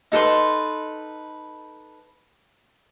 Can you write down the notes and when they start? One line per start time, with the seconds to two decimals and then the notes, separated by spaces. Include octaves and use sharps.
0.12 D#4 A4 B4 C6